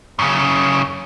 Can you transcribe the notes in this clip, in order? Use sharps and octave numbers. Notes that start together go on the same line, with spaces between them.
F#2 C#3